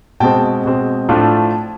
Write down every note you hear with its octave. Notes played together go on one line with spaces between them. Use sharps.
B2 G#3 C4 G5 A5
B2 G#3 C4
A2 F3 A3 D4 F4